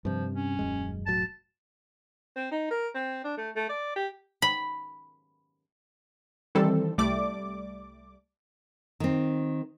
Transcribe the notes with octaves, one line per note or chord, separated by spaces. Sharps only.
G2 C3 F3
C#4
D#1 F#2 G#3
E1 A2 F#3 A5
C4
D#4
A#4
C4
D4
A3
A3
D5
G4
B5
D#3 E3 G3 C4 A4
C2 G3 A3 D5 D6
D#3 C4